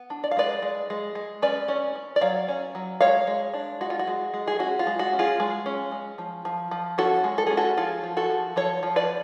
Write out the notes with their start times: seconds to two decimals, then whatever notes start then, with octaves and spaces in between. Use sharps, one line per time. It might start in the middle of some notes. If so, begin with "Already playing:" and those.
Already playing: B3
0.10 D4
0.24 D5
0.31 F5
0.37 G#3 B4 D5
0.62 G#3
0.90 G#3
1.15 G#3
1.42 C#4 B4 D5
1.68 C#4
1.95 C#4
2.16 D5
2.21 F#3 C#5 F5
2.48 C#4
2.75 F#3
3.01 G#3 C#5 F5
3.27 G#3
3.53 D4
3.81 G#3 F#4
3.90 F4
3.99 F#4
4.07 G#3
4.34 G#3
4.47 G#4
4.59 C#4 F#4
4.79 F4
4.87 G#3
4.99 F#4
5.13 C#4
5.19 F4 G#4
5.40 G#3
5.66 C#4
5.92 G#3
6.18 F3
6.45 F3
6.71 F3
6.98 C#4 F#4 A4
7.24 G#3
7.38 A4
7.47 C#4 G#4
7.57 F#4 A4
7.77 F3 F4 G#4
8.03 F3
8.17 F#4 A4
8.30 F3
8.56 F3 A4 C#5
8.83 F3
8.96 B4 D5